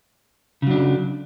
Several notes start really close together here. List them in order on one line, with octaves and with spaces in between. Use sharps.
C#3 F#3 D4